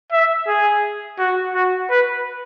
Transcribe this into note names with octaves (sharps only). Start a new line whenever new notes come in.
E5
G#4
F#4
F#4
B4